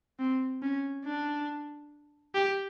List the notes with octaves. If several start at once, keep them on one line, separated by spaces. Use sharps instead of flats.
C4
C#4
D4
G4